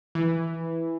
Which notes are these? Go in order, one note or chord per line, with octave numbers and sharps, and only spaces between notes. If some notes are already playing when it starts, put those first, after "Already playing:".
E3